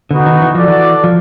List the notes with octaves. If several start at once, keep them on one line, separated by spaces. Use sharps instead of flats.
D3 B3 D#4 F#4
D#3
E3
F3 F#4 A4 D5
E3
F3